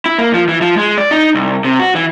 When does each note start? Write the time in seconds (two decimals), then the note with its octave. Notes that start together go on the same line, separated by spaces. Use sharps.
0.06 E4
0.18 A#3
0.34 F3
0.48 E3
0.61 F3
0.77 G#3
0.98 D5
1.11 D#4
1.35 C2
1.65 C3
1.79 F#4
1.95 E3